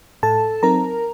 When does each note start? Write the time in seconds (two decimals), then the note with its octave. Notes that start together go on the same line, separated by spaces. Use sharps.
0.23 A2 A4 A5
0.63 F#3 C4 D#4 A#4 A#5